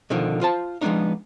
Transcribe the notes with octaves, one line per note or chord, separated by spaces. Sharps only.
B2 D3 D#3 F3
F4 C5 A5
F3 G#3 A#3 B3 D4 D#4